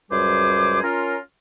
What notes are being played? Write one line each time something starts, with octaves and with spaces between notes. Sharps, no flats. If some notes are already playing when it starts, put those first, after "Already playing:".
C#2 F#2 G3 G#4 C5 D6
C#4 F4 A#4